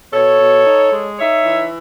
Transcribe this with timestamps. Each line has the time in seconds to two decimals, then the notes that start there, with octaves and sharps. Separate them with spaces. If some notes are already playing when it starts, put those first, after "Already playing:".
0.12 B2 A4 C#5
0.39 B2
0.66 D#4
0.92 G#3
1.19 D#4 C#5 E5
1.45 E3